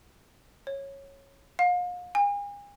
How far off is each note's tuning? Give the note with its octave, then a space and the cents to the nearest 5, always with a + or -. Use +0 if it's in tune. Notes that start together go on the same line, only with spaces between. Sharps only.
C#5 -10
F5 +40
G#5 -40